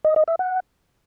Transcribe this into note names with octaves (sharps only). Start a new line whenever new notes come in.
D#5
D#5
E5
F#5